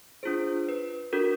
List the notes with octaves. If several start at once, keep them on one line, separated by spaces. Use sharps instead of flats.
D4 F4 G#4 C5
B4
D4 F#4 A4 A#4